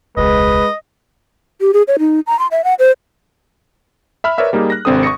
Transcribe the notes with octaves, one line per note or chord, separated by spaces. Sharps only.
E1 C#2 G#3 B4 D#5
G4
G#4
C#5
D#4
A#5
C6
E5
F#5
C5
E5 B5 F6
A#4 B4 C#5 D5 E5 F6
G3 A#3 D#4 G4 G#4
F#6 A#6
G#1 C3 C4 D4 A4 D#6
C#6 D#6 A#6 C#7